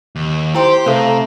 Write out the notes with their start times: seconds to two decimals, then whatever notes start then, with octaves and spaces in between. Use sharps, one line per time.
0.16 D#2
0.55 E4 G4 C5 G5 C6
0.86 C3 A3 A4 C5 F5 A#5